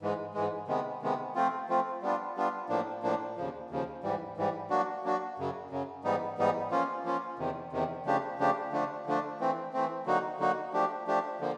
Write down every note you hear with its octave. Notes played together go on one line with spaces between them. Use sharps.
G#2 E3 G#3
G#2 E3 G#3
C3 D#3 G#3 B3
C3 D#3 G#3 B3
F3 A3 C4 F4
F3 A3 C4 F4
G3 B3 D4 F4
G3 B3 D4 F4
A2 F3 A#3 D4
A2 F3 A#3 D4
D#2 C#3 F3
D#2 C#3 F3
G#2 E3 G3
G#2 E3 G3
F#3 A#3 D4 F#4
F#3 A#3 D4 F#4
F#2 C#3 F#3
F#2 C#3 F#3
G#2 E3 G3 B3 D#4
G#2 E3 G3 B3 D#4
F3 A#3 C#4 F4
F3 A#3 C#4 F4
E2 C3 D#3
E2 C3 D#3
C#3 F3 A3 D4 G4
C#3 F3 A3 D4 G4
D3 F3 A3 D4
D3 F3 A3 D4
E3 A3 C4
E3 A3 C4
D3 F#3 A#3 D#4 F#4
D3 F#3 A#3 D#4 F#4
F3 A3 D4 G4
F3 A3 D4 G4
D3 F3 A#3